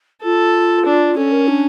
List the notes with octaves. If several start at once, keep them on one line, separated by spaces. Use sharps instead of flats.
F4 A4
D4
C#4 A4
A#4
D4